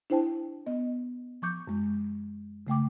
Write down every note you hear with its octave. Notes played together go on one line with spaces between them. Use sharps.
D4 E4 C5 G5 A5
B3 D#5
F3 C#6 D6 G6
F#2 G#3
C#3 A3 G5 D6